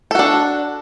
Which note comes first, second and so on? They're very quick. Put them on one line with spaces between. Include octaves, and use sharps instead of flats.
A4 F#4 D4